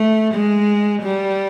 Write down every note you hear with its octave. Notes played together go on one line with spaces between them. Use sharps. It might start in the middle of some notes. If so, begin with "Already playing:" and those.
Already playing: A3
G#3
G3